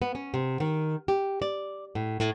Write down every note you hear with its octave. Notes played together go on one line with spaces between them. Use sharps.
B3
C#4
C3
D#3
G4
D5
A2
A2